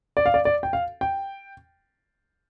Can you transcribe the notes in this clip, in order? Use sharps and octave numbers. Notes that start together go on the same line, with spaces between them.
D5
F5
D5
D5
G5
F5
G5